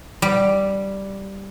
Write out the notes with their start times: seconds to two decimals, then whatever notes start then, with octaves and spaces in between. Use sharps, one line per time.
0.22 G3